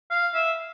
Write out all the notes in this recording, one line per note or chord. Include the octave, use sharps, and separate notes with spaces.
F5
E5